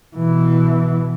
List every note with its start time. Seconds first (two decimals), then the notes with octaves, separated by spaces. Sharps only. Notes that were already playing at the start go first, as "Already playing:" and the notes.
0.16 B2 E3